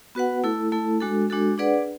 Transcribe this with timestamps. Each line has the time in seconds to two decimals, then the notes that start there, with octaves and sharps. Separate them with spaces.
0.15 B3 F#4 B4 F#5
0.44 A3 E4 A4
0.72 A3 E4 A4
1.01 G#3 D4 F#4 A4
1.30 G#3 D4 F#4 A4
1.58 D4 G#4 B4 D5 F#5